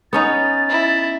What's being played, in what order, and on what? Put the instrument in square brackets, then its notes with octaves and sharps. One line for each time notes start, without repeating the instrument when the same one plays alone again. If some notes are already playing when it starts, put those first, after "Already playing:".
[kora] B3 C#4 D#4 [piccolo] A6
[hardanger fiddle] E4